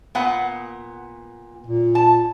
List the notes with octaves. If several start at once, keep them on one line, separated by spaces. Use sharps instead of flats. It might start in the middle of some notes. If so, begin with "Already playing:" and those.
A#2 B3 F#5
A#2
A5